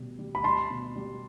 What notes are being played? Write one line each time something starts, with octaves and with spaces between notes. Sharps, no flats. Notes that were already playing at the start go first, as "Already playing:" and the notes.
Already playing: B2 G3
G3
B5
G3 A5 C6
B2
G3